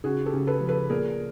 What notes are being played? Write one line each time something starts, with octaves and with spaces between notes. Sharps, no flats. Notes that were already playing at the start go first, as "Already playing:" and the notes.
C#3 F#4 G#4
G4 A4
C#3
A4 B4
F3
A4 B4
A#2 G#4 A#4